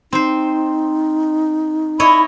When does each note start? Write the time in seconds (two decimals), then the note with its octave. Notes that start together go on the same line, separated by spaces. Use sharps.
0.12 C4 D#4 C5
2.00 E4 C#5 D#5 B5